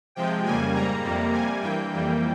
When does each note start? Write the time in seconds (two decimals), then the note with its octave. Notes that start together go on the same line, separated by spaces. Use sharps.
0.15 C3 F3 G#3 G5
0.44 F2 C#3 G3 A#3 G#5
0.74 G#2 G3 A#3 A#5
1.03 F2 C3 G3 A#3
1.32 C3 G3 A#3 G#5
1.62 G2 E3 A#3 G5
1.91 F2 E3 G3 A#3